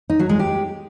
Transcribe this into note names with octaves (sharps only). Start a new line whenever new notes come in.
D#4
F#3
G#3
G4